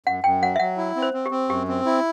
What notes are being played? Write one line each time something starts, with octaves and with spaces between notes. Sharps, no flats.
F#2 F#5
F#2 G5
F#3 F#5
E5
F#3 F#5
E4
C4
C5
C4
G4
C4
F#2 G4
C4
E4